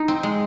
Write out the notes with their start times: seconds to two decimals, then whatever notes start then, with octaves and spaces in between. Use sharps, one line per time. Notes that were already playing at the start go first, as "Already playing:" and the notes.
Already playing: D#4
0.08 C4
0.23 G#3